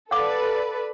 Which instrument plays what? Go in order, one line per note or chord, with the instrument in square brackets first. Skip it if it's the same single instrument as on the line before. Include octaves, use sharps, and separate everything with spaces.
[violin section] A4 B4 D5 [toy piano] F5 F#5 D6